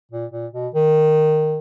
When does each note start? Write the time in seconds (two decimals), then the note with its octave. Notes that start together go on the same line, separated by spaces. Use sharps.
0.11 A#2
0.32 A#2
0.53 B2
0.74 D#3